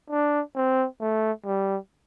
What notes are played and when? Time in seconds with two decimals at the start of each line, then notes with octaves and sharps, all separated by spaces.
0.10 D4
0.55 C4
1.00 A3
1.46 G3